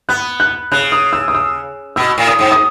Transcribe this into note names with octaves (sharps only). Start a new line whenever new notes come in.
B3 F#6
F#6
C#3 F#6
D#6
E6
D#6
E6
B2 E6
A2
D#6
G#2
D#6